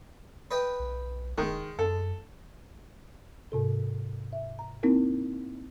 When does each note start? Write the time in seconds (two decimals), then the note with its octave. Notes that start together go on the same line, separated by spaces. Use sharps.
0.51 B4 D#5 G5
0.80 B1
1.38 D#1 D#3 G#3
1.79 F#2 A4
3.52 G#2 C3 A4
4.33 E5
4.59 A#5
4.83 A#3 C4 D#4 E4 A#4